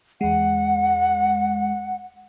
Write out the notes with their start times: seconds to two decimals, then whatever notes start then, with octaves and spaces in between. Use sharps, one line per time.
0.21 E2 G#3 F#5